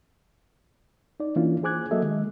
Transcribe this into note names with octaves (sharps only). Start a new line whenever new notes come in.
D#4 D5
E3 A#3 C#4 D4 E4 F4
G#4 C5 G#5 D6 F#6 G#6
F#3 A#3 F#4 A4 D#5 E5
D#3 G#3